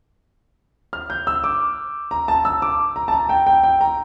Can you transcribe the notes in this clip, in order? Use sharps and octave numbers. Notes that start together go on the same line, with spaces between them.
F6
G6
E6
D6
A#5
A5
E6
D6
A#5
A5
A#5
G5
G5
G5
A#5